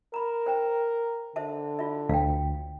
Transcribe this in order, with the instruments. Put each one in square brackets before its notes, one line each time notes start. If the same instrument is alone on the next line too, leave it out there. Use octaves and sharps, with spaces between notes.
[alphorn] A#4 [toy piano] A#5 B5
[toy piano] C5 G5 A#5
[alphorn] D3 [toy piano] C5 E5 A5
[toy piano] F4 E5
[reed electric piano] D2 [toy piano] F5 G5